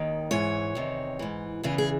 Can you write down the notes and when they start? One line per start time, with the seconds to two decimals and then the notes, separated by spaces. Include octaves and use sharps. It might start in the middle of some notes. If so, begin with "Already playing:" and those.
Already playing: D#2 D#3
0.31 G#2 E3 C#5
0.75 E2 C3 D#3
1.19 G#2 E3
1.63 E2 C#3 E3 G#4
1.78 G#4